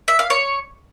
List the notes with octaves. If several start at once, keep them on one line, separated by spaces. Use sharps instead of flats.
E5
F5
C#5